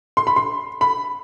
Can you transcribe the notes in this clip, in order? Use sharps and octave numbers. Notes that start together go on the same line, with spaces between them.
C6
B5
C6
B5